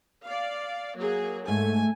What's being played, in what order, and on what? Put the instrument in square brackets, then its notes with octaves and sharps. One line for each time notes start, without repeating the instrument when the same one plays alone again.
[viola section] D5 F5
F#3 A#3 G#4
[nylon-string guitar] G#2 [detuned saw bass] A3 [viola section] G#5